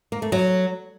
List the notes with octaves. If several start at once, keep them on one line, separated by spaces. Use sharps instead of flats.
A#3
A3
F#3